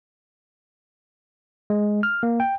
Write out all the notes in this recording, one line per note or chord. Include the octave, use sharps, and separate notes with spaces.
G#3
F6
A#3
G5